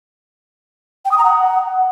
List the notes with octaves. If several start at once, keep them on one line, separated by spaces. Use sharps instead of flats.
G5
D#6
A#5
F#5